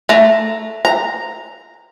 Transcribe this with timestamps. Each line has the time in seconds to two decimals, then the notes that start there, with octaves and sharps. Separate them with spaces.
0.09 A3 A#5
0.85 A#5